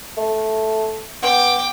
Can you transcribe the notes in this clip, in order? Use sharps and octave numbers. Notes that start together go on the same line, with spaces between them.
A3
B3 G5 D6